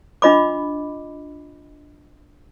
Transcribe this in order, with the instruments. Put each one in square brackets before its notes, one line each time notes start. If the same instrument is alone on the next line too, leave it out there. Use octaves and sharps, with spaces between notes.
[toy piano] D4 F4 D#5 B5 D6